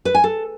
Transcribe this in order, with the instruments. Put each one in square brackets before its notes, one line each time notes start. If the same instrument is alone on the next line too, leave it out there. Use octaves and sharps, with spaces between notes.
[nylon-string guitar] B4
G#5
A4